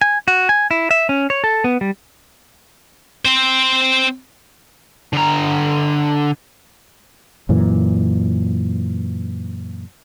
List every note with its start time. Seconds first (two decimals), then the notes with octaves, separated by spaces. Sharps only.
0.01 G#5
0.28 F#4
0.49 G#5
0.71 E4
0.91 E5
1.09 C#4
1.30 C#5
1.44 A4
1.64 B3
1.81 G3
3.25 C4 C5
5.13 D3 A#5
7.49 F#2 A#2 E3